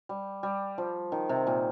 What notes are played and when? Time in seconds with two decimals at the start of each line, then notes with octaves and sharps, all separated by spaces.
0.09 G3
0.43 G3
0.78 F3
1.12 D#3
1.29 C3
1.47 A#2